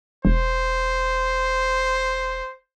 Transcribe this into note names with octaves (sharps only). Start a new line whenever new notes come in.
E1 C5